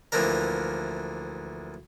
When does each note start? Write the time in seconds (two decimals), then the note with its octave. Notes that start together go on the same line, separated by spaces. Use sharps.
0.12 D2 E3 F3 A#3 D4 A#4